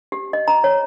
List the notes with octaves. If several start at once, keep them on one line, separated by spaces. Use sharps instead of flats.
G4
D#5
A#5
C#5